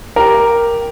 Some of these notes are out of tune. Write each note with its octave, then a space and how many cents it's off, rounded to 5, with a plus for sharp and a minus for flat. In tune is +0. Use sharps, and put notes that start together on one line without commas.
G4 +0 A#4 +0